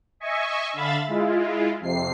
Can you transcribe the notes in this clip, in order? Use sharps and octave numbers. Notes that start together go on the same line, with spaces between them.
D#5 E5 G#5 C#6
D3 E5 F5 B5 A6
G#3 E4 F4
F2 C3 C7